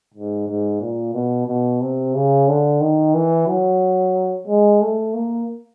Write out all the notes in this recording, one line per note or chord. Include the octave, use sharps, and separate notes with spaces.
G#2
G#2
A#2
B2
B2
C3
C#3
D3
D#3
E3
F#3
G#3
A3
A#3